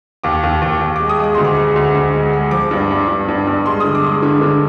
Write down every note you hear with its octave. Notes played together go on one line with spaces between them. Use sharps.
D#2 D6
D#2
D#2
D#2
G#3 D6
D#6
G#3 D6
D2 C6
D6
G#3
D2
D2
G#3
G#3
F3 D6
G2
G2
G2
G2
G2
G#3 C6
D3 D#6
D6
G#3
D3
D3